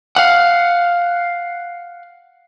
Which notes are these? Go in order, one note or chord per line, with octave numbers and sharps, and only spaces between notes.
F5 F#5